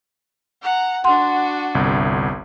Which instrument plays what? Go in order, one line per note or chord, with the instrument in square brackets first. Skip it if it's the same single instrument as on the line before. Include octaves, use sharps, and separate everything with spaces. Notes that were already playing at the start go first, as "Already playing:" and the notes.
[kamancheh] F#5 A#5
[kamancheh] D4 F#4 [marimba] F#5 C6
[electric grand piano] G1 C2